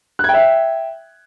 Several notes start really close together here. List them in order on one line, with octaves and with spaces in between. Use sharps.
F#6 G#6 G5 E5